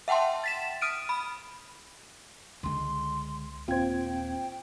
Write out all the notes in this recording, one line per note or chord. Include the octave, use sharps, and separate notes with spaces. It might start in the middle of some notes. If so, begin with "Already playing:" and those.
E5 F#5 G5 A5 C6
A6 B6 E7
D#6 F6 D7 D#7
B5
C#2 D3 G#3 C6
D#1 C4 F4 C5 G5 G#6